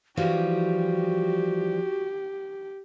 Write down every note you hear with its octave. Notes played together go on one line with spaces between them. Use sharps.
E3 F3 G3 F#4 G4